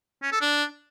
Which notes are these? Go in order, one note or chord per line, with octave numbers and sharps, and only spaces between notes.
C#4
A4
D4